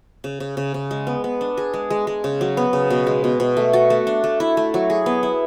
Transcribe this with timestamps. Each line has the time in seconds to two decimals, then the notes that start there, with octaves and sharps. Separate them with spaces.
0.24 C#3
0.40 C#3
0.57 C#3
0.74 C#3
0.91 G#3
1.07 B3
1.24 B3
1.41 D4
1.57 G#4
1.74 G#3
1.90 G#3
2.07 G#3
2.24 C#3
2.41 F#3
2.57 B3
2.73 C#3
2.90 B2
3.07 G#3
3.24 B2
3.40 B2
3.57 A3
3.73 F#4
3.90 A3
4.07 D4
4.24 A3
4.40 E4
4.57 A3
4.74 F#3
4.90 G#4
5.06 B3
5.23 E4